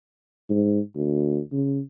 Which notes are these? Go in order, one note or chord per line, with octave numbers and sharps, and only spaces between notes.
G#2
D2
C#3